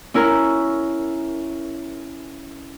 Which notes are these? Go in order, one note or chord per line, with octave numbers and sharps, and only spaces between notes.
C#4 E4 A#4